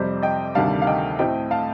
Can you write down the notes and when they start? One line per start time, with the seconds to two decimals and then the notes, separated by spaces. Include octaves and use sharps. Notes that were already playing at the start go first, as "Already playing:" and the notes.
Already playing: F2 C3 G3 C5
0.22 D#5 G5
0.55 D2 C3 D#3 G3 F5 A5
0.82 F5
0.87 D#5 G5
1.19 A2 A3 C4 D#5 G5
1.51 F5 A5